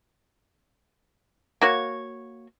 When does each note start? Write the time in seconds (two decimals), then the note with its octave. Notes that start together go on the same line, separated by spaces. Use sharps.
1.61 A#3 F#4 C#5